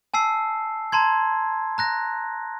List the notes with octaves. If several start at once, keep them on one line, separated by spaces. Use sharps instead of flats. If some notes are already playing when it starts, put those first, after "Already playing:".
G#5 A5 E6 C7
A5 A#5 C6 G#6
A#5 F#6 A#6